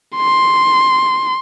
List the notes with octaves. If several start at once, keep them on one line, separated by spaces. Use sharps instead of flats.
C6